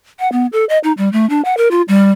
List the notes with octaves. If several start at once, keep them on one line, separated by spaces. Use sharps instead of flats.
F#5
B3
A4
D#5
D#4
G3
A3
D4
F#5
A#4
F4
G3